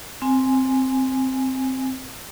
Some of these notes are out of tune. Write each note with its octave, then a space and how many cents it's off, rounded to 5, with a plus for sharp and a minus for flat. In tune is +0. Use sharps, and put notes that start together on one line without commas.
C4 +0 G#5 +0